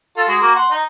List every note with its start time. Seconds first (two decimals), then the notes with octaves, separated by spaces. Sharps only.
0.17 F4 A4
0.28 G#3 F#4 G#4
0.42 A#3 F#4
0.56 F#5 C6
0.71 D#4